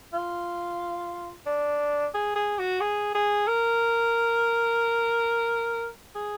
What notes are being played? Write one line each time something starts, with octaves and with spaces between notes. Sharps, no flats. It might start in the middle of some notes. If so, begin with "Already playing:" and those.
F4
D4
G#4
G#4
F#4
G#4
G#4
A#4
G#4